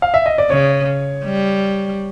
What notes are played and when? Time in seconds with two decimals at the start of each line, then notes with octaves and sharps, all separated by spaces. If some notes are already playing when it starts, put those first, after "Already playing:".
0.02 F5
0.14 E5
0.26 D#5
0.38 D5
0.50 C#3 C#5
1.25 G3